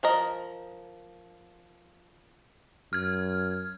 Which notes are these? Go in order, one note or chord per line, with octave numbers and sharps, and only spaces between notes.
F3 A#4 D#5
F#2 F6 G#6